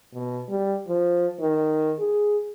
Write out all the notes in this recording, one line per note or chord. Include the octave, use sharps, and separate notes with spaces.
B2
G3
F3
D#3
G#4